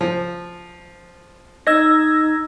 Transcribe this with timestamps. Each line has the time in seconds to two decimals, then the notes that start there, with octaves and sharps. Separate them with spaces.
0.01 F3
1.67 D#4 D#5 E6 G#6 A#6